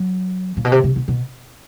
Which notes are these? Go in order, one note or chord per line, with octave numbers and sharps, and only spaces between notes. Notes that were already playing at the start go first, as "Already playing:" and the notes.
Already playing: F#3
A#2
B2
C3
C3
B2
B2